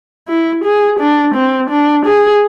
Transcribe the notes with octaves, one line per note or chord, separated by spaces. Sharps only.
E4
G#4
D4
C4
D4
G#4